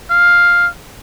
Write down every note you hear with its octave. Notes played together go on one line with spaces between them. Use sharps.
F5